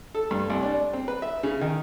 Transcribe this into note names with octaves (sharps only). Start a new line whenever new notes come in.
A4
G2
C2
D4
C4
B4
E5
C#3
D#3